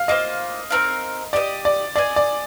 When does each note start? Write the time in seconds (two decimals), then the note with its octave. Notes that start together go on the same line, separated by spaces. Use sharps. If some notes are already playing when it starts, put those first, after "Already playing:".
Already playing: F5
0.08 A#3 F4 C5 D#5
0.70 C4 D#4 A#4 F5
1.33 G4 C5 D5 D#5
1.65 D5
1.96 G#4 D5 D#5 G#5
2.16 D5